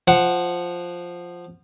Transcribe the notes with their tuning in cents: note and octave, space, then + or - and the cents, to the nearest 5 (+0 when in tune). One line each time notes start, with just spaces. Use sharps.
F3 +0 F#5 +0